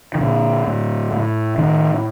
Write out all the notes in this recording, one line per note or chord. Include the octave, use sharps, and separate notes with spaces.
D#3
A#2 D3
A2
A2
A2 D#3